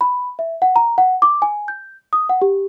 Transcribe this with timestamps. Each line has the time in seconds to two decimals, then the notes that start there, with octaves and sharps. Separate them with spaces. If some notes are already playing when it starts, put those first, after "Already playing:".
0.01 B5
0.39 E5
0.62 F#5
0.76 A#5
0.98 F#5
1.22 D6
1.42 G#5
1.68 G6
2.13 D#6
2.29 F#5
2.42 G4